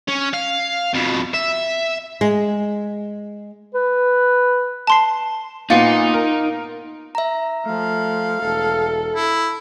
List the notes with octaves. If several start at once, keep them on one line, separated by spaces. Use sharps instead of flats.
C#4
F5
F2 B2
E5
G#3
B4
A5 C6 C7
A#2 B3 D#4 F4 C#7
A#4
E5 A#5
F3 A3 F5
E1 A4
E4